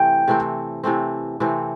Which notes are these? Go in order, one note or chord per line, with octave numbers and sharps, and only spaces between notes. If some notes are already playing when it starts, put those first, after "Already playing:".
Already playing: C3 E3 A3 C4 G5
C3 E3 A3 C4
C3 E3 A3 C4
C3 E3 A3 C4